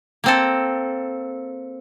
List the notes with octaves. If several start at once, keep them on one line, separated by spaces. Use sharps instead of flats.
A#3 C4 A4